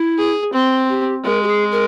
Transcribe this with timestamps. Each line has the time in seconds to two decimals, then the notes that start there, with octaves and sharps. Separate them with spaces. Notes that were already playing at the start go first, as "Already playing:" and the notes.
Already playing: E4
0.18 G#4
0.53 C4
0.89 G4
1.24 G#3 A#4
1.43 G4
1.48 G#4
1.72 A#4